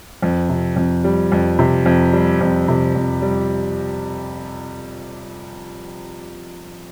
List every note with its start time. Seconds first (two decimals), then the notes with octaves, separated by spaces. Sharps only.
0.22 F2
0.49 C3
0.76 F2
1.04 G3
1.32 F2
1.59 C3
1.86 F2
2.13 G3
2.41 F2
2.68 C3
2.95 F2
3.22 G3